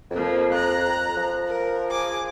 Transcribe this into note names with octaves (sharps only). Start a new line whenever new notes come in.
F2 F3 A#3
A#5 F#6
F3
A#4
G#4 D6